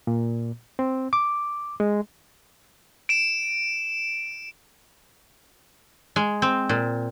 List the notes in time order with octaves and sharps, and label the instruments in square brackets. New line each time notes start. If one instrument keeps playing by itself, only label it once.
[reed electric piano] A#2
C4
D6
G#3
[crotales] D7 E7
[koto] G#3
C4
A#2